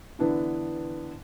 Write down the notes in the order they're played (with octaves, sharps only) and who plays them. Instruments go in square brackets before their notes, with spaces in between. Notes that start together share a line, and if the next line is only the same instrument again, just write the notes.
[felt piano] D3 E3 B3 D4 E4